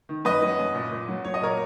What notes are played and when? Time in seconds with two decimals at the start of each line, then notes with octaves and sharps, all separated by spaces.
0.09 D#3
0.25 F#2 B4 D#5
0.42 F#3
0.59 F#2
0.75 A#2
0.91 A#2
1.08 F#3
1.25 F#3 C#5
1.34 D#5
1.42 A#2 A#4 C#5